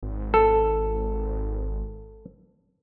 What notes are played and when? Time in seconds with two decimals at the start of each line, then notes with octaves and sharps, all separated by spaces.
0.03 G#1
0.34 A4